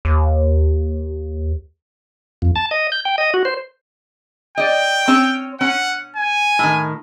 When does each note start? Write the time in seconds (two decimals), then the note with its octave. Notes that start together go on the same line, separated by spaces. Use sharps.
0.05 D#2
2.42 F2
2.56 A5
2.71 D#5
2.92 G6
3.05 G5
3.18 D#5
3.34 F#4
3.45 C5
4.58 D5 D#5 G5
5.08 C4 C#4 C#5
5.61 C#4 F#5
6.16 G#5
6.59 A2 D#3